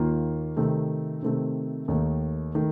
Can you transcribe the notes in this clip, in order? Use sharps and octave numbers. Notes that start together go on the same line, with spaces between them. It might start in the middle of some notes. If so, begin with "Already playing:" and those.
Already playing: D#2 D#3 A#3 F4
C3 D#3 A3 C4
C3 D#3 A3 C4
D#2 D#3 A3 D#4
D#3 A3 D#4